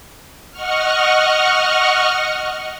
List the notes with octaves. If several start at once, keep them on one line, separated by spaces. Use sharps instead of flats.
D#5 F#5 C#6 F6